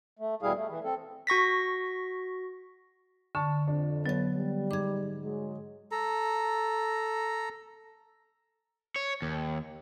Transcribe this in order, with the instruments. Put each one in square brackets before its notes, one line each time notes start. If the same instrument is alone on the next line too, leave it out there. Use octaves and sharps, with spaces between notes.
[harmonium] A3
E2 B2 G3 E4 G#4 F5
A3
E3
C4 A4
[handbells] F#4 C#6 A#6 B6
[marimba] D3 [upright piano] A5 C#6
[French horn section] F2 [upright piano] D4
[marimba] F#3 A6 [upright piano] B3 C#5
[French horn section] G3
[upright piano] G#2 [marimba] D6 G#6
[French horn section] F#3 G#3
[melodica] A4 A#5
[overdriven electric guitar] C#5
D#2